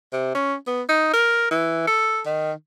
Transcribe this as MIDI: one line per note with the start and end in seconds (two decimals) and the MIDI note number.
0.13 0.33 48
0.35 0.56 61
0.67 0.83 59
0.89 1.12 63
1.14 1.48 70
1.51 1.83 52
1.87 2.21 69
2.26 2.52 51